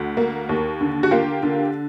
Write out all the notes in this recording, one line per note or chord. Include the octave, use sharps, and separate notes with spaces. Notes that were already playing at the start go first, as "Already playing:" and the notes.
Already playing: D2
A#3
D#2
D3
F#4
A#3 F4 G4
D3